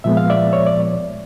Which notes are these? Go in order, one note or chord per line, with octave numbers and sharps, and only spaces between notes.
A#2 F3 G#3 B3 E5
F5
D5 E5
C#5
D5